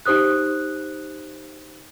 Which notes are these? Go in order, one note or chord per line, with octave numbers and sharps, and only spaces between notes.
D#4 G4 C5 D#6 F#6